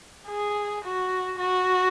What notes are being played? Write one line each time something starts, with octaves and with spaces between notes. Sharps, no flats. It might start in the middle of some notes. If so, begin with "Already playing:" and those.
G#4
F#4
F#4